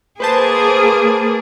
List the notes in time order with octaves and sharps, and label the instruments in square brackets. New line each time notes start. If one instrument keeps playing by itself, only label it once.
[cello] A#3 G#4 [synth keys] B4 C5 A5